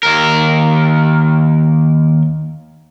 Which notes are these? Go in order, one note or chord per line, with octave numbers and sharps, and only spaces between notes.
D#2 A#4